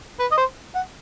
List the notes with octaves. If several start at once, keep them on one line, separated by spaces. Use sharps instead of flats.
B4
D#5
C5
F#5